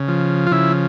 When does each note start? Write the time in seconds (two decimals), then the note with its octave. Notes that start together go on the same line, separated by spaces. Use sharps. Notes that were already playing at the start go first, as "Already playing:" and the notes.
Already playing: C#3
0.08 F3
0.47 F4
0.51 C#3 E4